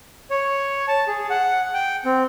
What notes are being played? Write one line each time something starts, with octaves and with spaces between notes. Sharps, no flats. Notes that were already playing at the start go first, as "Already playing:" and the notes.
C#5
A5
G#4
F#5
G5
C4